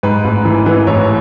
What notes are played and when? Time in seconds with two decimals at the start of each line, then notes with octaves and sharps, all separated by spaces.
0.03 G#2 B4
0.24 A1
0.45 E3
0.66 E3
0.87 A1 C#5